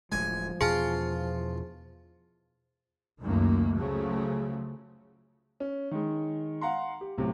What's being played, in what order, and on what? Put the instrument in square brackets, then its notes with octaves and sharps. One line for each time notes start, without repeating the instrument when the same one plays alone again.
[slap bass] D1 D2 G#3 [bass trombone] F3 [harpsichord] G#5
[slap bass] E2 B2 [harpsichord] F4 C6 [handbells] G#4 G#5 A5
[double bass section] C#2 F#2 D#3 A3 A#3
C#3 F3 F#3 A3
[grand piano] C#4
D#3 G#3
F5 F#5 A#5 C6
G4
B1 A2 C3